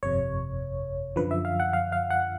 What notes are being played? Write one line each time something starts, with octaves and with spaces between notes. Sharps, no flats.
G1 F2 C3 C#5
F#2 D3 F3 B4
E5
F5
F#5
F5
F5
F#5